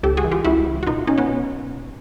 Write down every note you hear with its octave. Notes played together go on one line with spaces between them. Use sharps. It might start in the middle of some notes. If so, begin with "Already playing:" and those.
C#2 G4 A4
F#4 G#4
E3
F4 G4
C#2 E4 F#4
C#2
F#4
B2 D#4 F4
B2 C#4 D#4
B3 C#4
B2